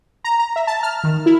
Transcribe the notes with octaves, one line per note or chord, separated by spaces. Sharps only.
A#5
A#5
E5
A5
F6
D#3
E4